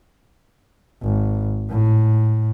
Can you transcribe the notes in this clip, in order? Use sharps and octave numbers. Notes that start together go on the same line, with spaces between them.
G#1
A2